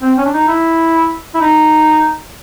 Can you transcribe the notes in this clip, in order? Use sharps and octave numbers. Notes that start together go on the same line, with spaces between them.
C4
C#4
D4
D#4
E4
E4
D#4